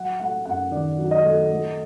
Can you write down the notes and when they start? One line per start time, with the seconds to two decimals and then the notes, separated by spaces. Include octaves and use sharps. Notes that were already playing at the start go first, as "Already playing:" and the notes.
Already playing: F#3 F#5
0.20 A3 F#5
0.46 F#2 F#5
0.71 D#3 D5
0.98 F#3
1.11 D#5
1.24 A3
1.51 A3